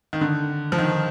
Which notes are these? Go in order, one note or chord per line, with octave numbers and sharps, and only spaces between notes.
D#3
D3
F3
D#3